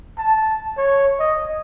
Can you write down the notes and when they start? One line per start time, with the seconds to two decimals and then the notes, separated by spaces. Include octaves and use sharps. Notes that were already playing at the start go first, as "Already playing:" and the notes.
0.18 A5
0.77 C#5
1.19 D#5